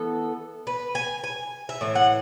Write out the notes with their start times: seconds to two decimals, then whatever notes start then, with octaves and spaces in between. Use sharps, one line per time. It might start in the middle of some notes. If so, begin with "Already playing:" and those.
Already playing: E3 B3 A4
0.67 B4
0.95 G#5
1.24 G#5
1.69 E5
1.81 A2 E3
1.95 F#5